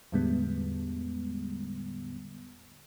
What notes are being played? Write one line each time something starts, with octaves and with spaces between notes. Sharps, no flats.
E2 A2 D3 G3 G#3 B3